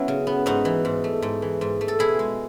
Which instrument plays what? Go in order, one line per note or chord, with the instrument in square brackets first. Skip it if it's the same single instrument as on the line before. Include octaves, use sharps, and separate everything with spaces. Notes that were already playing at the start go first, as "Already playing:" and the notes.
Already playing: [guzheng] F#3 B3 C#4 E4
C#3
B3
G#2 D#4 F#4
E3
G#2
A3
G#2
E3
G#2
A3
A4
B2 E4 G#4
G#3